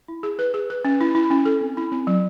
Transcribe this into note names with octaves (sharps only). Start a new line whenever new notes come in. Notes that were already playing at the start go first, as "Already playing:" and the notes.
E4
G#4
B4
G#4
B4
C#4
E4
E4
C#4
A4
C4
E4
C4
F#3